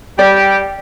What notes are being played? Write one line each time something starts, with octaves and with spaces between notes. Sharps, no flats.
G3 G4 D5